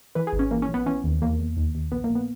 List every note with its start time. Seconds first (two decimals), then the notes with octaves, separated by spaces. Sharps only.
0.15 E3 B4
0.27 G#4
0.33 G#1
0.39 C#4
0.51 E3 A#3
0.62 C#4
0.69 A#1
0.74 B3
0.86 E3 C#4
1.04 D#2
1.22 E2 A#3
1.39 E2
1.57 D#2
1.75 D#2
1.92 A#1 B3
2.04 A#3
2.09 A#1
2.15 B3